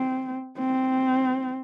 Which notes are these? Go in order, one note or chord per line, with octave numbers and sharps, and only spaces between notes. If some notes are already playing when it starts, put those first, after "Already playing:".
Already playing: C4
C4